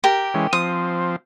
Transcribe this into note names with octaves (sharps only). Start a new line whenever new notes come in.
G4 A#4
E3 G#3 C#4
F3 C4 D#6